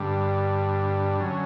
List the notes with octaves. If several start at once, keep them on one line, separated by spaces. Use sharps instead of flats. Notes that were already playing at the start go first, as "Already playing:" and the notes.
Already playing: G2 D3 G3
D3 F#3 C#4